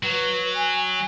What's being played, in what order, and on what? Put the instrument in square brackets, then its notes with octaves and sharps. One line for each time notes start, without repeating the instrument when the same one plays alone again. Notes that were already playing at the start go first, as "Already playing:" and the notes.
[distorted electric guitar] F#3 [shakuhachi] B4
[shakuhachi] G#5